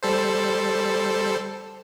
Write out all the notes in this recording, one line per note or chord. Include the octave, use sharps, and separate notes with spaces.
G3 A4 C5